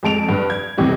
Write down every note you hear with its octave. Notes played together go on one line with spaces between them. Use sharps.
F2 G#3 A5 D7 F7
G2 B4
G#6
B1 F2 C3 E3 G3